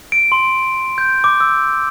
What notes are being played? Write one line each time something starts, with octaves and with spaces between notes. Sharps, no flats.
D7
C6
G6
D6
E6